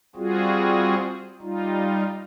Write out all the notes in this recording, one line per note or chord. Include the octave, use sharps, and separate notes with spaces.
G3 C4 F4 F#4 G#4
G3 D#4 F4